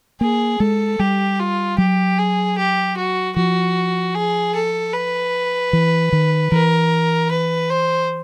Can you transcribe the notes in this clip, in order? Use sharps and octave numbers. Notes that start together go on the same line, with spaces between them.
A#3 G#4
G#3 A4
G3 G4
F4
F#3 G4
G#4
G4
F#4
F3 F#4
G#4
A4
B4
E3
D#3
E3 A#4
B4
C5